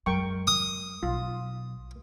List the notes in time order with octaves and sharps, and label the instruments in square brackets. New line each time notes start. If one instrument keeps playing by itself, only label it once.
[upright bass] F#2 G#3 [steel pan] A#4 G5 C#6
[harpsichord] D#6
[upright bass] B1 [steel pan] F4